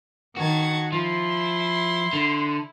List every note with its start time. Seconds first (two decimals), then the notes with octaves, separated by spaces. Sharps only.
0.37 D#3 F#4 A5 G#6
0.92 F3 E4 C6
2.13 D3